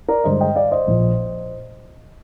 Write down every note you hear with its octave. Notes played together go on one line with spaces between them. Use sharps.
A#4 D5
G2 D3 G#3 C5 D#5
D#5 G5
D5 F5
C5 D#5
A#1 A#2 F3